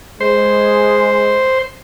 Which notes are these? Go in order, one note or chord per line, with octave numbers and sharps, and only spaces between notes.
G#3 C5